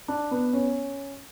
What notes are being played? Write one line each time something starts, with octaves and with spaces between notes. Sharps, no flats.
D4
B3
C#4